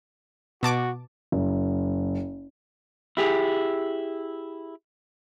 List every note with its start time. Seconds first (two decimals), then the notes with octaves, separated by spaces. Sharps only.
0.63 B2 F#4 A5 D6
1.32 F#1
3.17 E4 G4 G#4